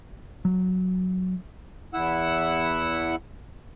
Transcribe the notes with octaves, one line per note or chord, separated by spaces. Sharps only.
F#3
E2 E4 F#5 E6